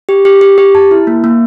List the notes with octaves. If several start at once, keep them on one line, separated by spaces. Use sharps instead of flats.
G4
G4
G4
G4
A5
E4
A#3
A#3